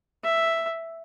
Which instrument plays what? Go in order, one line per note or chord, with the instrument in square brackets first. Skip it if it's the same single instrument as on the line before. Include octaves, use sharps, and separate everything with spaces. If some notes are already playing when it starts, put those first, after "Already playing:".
[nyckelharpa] E5